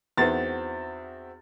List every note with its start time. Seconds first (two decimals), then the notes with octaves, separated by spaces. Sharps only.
0.17 E2 C4 D#4 F#4 A#4 B4 E5 A6